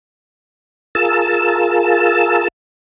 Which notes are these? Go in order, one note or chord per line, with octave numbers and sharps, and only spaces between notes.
F4 G#4 A#4 A5 E6